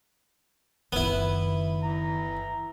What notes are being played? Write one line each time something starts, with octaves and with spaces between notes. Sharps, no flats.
F#1 D#3 B3 E4
E3 A#5